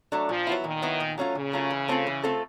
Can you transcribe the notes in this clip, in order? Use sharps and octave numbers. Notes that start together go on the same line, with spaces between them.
F#3 A3 D4
A#2 F3
F#3 B3 E4
A#2 D#3
F#3 B3 E4
A#2
F#3 A3 C#4 F4
A#2 C#3
F#3 A3 C#4 F4
E3
A3 C4 F4 A4
E3
A3 C4 F4 A4